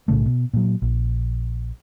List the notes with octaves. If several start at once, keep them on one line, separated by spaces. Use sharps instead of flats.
B1 A2 C#3 A3
B2
A#2 F#3
A#1